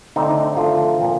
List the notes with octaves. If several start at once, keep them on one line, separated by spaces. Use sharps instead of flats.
D3 A3 C4 D#4
D#4
D3 F3 A3 D4 F4
A#2 F3 C4